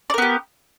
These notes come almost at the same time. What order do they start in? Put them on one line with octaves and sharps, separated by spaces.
D5 A#4 B3 G4